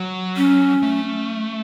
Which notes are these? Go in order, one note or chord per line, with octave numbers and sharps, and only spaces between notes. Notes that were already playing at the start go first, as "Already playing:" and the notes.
Already playing: F#3
C#4
A3